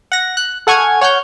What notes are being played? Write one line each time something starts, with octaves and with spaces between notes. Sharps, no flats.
F#5 A#6
F#6
A4 F#5 G#5 C#6 F6 G#6
C#5 F#5 F6 G6